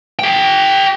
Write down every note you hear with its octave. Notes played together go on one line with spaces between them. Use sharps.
G#4 G5